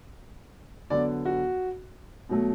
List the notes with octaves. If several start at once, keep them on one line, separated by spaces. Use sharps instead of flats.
D3 F#3 B3 D5
F#4
B2 F#3 A3